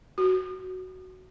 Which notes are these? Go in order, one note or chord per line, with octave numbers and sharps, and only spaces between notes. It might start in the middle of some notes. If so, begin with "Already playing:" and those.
F#4